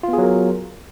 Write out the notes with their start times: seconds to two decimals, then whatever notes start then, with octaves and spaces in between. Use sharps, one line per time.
0.03 F4
0.08 B3
0.13 G#4
0.18 F#3
0.23 A#4